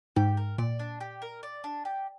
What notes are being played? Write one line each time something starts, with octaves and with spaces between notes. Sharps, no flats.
G#2 G4
A#4
A#2 D5
D4
G4
A#4
D5
D4
G4